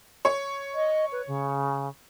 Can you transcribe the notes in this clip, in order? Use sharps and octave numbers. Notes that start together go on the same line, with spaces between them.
C#5
D#5
B4
C#3